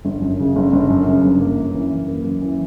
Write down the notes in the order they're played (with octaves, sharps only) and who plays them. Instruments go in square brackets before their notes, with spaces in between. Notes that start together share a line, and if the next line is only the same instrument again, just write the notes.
[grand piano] G1
F#2
C#3
G1
G1
F#2
C#3
G1
A#3
F#2
E3
F#1
A#3
F#2
E3